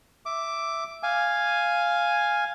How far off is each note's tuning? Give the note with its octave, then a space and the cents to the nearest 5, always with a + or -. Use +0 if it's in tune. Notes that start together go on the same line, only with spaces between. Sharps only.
E5 +0 D6 +0
F5 +0 G#5 +0